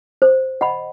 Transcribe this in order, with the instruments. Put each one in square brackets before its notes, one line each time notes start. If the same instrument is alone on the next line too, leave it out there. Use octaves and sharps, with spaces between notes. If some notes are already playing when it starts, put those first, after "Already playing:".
[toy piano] C5
D#5 F#5 B5